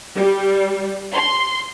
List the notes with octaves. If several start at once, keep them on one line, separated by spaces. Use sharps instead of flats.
G3
C6